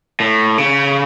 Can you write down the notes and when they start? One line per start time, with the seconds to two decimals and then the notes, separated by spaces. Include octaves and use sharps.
0.20 A2
0.58 C#3